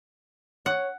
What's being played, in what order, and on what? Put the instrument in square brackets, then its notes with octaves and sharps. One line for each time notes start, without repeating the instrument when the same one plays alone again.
[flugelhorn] C#5 [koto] F#5